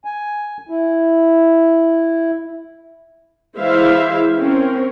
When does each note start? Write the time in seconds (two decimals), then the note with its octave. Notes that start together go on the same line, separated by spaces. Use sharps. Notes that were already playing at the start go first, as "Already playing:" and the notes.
0.05 G#5
0.69 E4
3.57 E3 G#3 E4 C5 E5 F5
4.37 C4 C#4 A#4